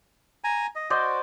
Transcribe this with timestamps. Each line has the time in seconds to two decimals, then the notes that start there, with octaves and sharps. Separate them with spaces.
0.44 G#5 A#5
0.75 D#5
0.90 F#4 C5 D5 D#5